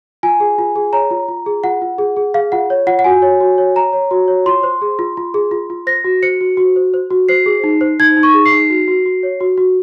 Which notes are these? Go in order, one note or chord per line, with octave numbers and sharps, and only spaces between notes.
F4 G#5
G#4
F4
G#4
C#5 A#5
F4
F4
G#4
F4 F#5
F4
G#4
G#4
G#4 F5
F4 F#5
C#5
F4 F#5
F#5
F#4 G#5
C#5
F#4
C#5
C#5 A#5
C#5
F#4
C#5
F4 C6
C5
G#4
F4
F4
G#4
F4
F4
C5 A#6
F#4
C5 C#7
F#4
F#4
C5
C5
F#4
C5 C7
G#4
D#4
C5
D#4 G#6
D#4
C#6
G#4
C7
D#4
F#4
F#4
F#4
C#5
F#4
F#4